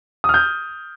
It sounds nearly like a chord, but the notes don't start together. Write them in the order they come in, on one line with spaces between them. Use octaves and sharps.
D#6 F6 G6